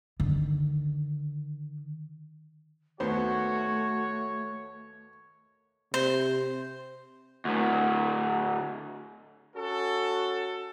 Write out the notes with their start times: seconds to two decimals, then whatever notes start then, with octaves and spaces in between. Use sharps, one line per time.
0.20 D3 D#3
3.00 D#2 A3 B3 F#4 C5 C#5
5.94 C3 C5
7.45 D2 A2
9.55 C#4 F#4 A4